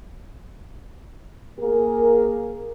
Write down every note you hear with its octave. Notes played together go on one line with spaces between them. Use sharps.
A#3 G#4 A#4